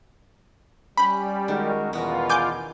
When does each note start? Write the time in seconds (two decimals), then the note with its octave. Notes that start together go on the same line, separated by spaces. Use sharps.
0.97 G3 C#4 G4 B5
1.48 D#3 G#3 F#4 A#4
1.93 E2 B2 B3 F4 F#4 A#4
2.29 G#5 D6 G6